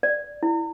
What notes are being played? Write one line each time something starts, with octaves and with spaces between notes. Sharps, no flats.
D5
E4